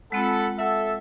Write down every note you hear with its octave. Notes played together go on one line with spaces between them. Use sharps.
G#3 C4 F4 A4 F#5 B5
A4 E5 F#5